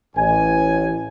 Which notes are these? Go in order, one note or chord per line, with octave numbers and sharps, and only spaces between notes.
A1 G#5